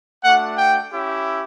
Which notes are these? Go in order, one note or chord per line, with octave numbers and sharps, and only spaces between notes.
A3 D4 F#4 F#5
G5
C#4 E4 G4